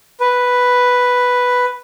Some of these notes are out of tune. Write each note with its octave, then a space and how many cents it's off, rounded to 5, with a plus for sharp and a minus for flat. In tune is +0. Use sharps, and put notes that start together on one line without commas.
B4 +0